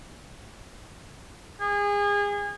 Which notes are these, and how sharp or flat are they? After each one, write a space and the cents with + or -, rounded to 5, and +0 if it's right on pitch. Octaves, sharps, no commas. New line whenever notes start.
G#4 -30